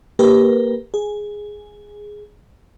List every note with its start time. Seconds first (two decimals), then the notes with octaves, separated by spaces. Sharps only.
0.19 A#3 G4 A#4 B4
0.94 G#4